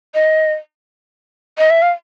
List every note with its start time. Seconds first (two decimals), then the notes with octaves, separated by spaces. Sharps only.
0.15 D#5
1.58 D#5
1.70 E5
1.82 F5